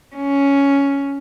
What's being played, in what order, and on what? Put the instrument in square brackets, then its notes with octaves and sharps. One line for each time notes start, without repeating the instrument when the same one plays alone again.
[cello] C#4